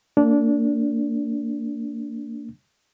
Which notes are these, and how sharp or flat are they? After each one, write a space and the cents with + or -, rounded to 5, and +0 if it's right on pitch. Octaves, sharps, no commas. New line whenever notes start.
A#3 -30 D4 -20